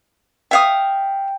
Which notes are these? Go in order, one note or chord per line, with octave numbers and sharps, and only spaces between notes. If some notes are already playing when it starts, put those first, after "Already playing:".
E5 F5 G5 D#6